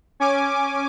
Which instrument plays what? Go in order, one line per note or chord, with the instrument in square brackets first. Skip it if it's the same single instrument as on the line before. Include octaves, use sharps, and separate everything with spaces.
[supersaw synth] C#4 G#5 D6